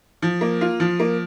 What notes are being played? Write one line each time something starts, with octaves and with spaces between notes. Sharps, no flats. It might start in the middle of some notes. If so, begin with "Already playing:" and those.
F3
A#3
F4
F3
A#3